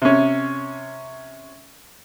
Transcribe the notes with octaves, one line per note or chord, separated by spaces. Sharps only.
C3 C#4